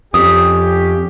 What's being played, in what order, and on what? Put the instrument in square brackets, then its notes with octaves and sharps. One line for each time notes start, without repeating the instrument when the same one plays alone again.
[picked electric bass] F2 [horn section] C#4 G4 [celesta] D#6